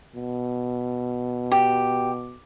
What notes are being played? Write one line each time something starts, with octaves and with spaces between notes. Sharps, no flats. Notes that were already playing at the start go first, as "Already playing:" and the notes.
B2
G4